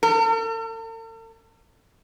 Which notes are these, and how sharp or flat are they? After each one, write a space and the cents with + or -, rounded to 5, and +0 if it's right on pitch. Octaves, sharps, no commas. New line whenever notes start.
A4 +45